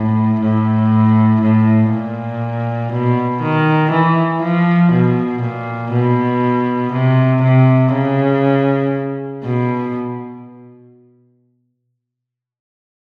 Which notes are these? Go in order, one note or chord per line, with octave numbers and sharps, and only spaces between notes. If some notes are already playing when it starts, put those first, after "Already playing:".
Already playing: A2
A2
A2
A#2
B2
D#3
E3
F3
B2
A#2
B2
C3
C3
C#3
B2